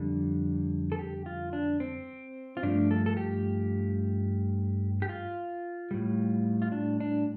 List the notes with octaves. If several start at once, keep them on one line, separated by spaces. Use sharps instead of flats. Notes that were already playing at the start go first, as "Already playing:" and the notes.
Already playing: F2 D3 G3
A4
G4
F4
D4
C4
F4
G2 F3 A3 D4
A4
A4
G4
G4
F4
A2 G3
F4
D4
D4